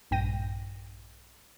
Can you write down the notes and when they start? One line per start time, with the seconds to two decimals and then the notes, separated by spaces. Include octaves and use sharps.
0.11 A#1 G2 G5 A#6 D#7